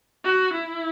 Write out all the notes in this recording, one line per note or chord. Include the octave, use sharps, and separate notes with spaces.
F#4
E4